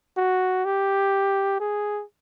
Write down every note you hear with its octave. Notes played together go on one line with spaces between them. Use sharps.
F#4
G4
G#4